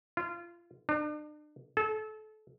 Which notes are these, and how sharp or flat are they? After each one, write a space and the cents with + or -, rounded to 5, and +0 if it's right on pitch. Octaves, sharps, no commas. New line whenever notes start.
F4 -25
D4 +40
A4 -30